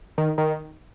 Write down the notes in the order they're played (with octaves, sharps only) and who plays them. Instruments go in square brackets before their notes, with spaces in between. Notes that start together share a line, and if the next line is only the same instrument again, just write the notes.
[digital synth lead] D#3
D#3